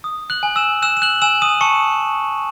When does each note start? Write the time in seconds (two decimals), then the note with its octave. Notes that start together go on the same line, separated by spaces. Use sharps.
0.04 D#6
0.30 F#6 F#7
0.43 G#5
0.56 E6 E7
0.82 E6 F#6 E7
0.97 E7
1.02 F#6 F#7
1.22 G#5 E6 E7
1.42 D#6 D#7
1.61 A5 C#6 C#7